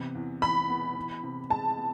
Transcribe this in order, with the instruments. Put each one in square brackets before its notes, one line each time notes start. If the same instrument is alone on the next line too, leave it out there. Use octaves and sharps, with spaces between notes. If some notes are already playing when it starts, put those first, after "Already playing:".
Already playing: [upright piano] C3 E3 B3
E2
[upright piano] E3 [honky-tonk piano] B5
[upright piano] B3
E3
C3
[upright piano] G#3 [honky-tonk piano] A5
[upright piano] B3